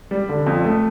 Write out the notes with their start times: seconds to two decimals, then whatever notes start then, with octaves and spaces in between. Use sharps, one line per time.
0.11 G3
0.29 D3
0.46 F2
0.64 A3